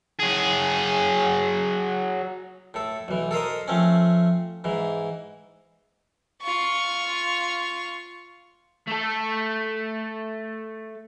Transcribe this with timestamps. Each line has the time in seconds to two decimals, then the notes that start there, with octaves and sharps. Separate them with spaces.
0.19 F#3 G#4
2.74 A2 A4
3.08 B1 E3
3.31 A4 A#4 C5 D#5
3.68 F3 A3 C4 C#4
4.64 G#2 E3
6.43 F4 C#6
8.88 A3 A4